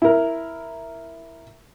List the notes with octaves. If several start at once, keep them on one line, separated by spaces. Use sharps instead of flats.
E4 A#4